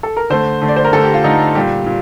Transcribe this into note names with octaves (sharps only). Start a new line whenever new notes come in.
A4
A#4
D3 A3 C5
D3 A3
D5
C5
A#4
D3 A3 A4
G4
F4
D3 A3 D#4
A#2 G3 G4
A#2